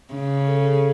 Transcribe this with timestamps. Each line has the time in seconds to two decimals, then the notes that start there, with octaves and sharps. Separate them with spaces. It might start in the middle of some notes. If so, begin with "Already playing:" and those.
0.14 C#3
0.47 A4
0.59 G#4
0.64 A4